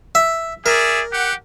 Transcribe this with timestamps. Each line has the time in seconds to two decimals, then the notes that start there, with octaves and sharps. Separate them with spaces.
0.15 E5
0.66 G#4 A#4 D5 E5
1.11 G4 F#5